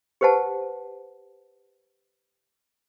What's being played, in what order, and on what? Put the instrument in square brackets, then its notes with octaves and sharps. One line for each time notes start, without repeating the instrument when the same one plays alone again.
[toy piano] G4 B4 C5 F#5 A5